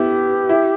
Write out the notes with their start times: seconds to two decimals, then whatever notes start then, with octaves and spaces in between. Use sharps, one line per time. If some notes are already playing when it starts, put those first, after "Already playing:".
Already playing: B3 E4 G4
0.49 E4